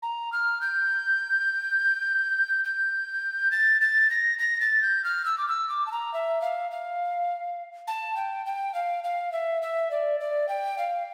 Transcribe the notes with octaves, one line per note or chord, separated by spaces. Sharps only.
A#5
F6
G6
G6
A6
A6
A#6
A#6
A6
G6
F6
E6
D6
E6
D6
A5
A#5
E5
F5
F5
A5
G5
G5
F5
F5
E5
E5
D5
D5
G5
F5